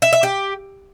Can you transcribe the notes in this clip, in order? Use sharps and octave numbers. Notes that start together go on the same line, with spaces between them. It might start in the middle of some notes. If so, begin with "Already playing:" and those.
E5
E5
G4